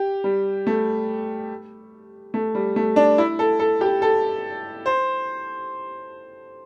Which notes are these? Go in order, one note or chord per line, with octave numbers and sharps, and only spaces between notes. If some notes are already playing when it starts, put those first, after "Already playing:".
Already playing: G4
G3
A3
A3
G3
A3
D4
E4
A4
A4
G4
A4
C5